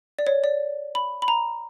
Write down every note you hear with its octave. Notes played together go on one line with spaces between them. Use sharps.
D5
C#5
D5
B5
B5
A#5